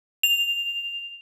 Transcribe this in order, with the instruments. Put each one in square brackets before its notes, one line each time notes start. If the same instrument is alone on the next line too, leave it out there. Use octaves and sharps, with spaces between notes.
[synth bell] F7